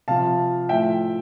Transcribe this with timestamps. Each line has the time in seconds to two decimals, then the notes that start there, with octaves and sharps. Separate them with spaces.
0.08 C3 F3 F5 A5
0.69 A2 F3 E5 G5